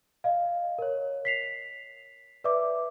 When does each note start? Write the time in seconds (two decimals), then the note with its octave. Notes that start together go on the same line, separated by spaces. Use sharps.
0.24 D#5 F5
0.78 A#4 C#5
1.25 B6 C7 F7
2.44 B4 D5 E5 D6